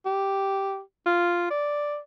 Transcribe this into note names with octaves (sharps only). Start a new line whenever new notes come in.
G4
F4
D5